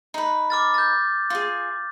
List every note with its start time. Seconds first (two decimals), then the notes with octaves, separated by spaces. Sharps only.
0.14 D#4 B4
0.50 D6 F6 A6
0.74 G6 A6
1.30 F4 G#4